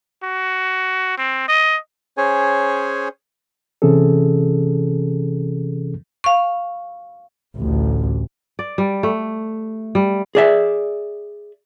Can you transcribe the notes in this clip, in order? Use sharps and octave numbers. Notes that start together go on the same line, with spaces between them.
F#4
C4
D#5
C#4 G#4 C5 C#5 G#5
C3 E3 C#4 G#4 A4
F5 C#6
A1 D2
D5
G3
A3
G3
G#4 D5 E5